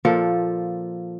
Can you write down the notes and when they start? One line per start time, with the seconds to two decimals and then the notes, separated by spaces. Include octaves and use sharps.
0.05 A#2 F3 A4